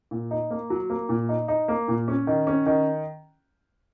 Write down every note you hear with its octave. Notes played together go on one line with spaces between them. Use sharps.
A#2
D#4
A#3
F#3
A#3
A#2
D#4
D#4
A#3
A#2
C#4
D#3
C#4
D#3